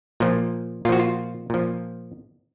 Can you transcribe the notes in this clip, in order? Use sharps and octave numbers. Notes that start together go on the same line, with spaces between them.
A#2 F3
A#2 F3 F4 F#4
F4
A#2 F3